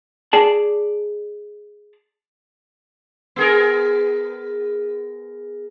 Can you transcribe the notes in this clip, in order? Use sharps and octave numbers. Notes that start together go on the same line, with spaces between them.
G#4 D5 A5
B3 G#4 A#4